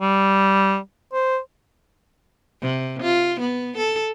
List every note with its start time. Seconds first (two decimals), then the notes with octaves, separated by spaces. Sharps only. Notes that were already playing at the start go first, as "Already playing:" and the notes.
0.01 G3
1.13 C5
2.61 C3
3.02 F4
3.40 B3
3.77 A4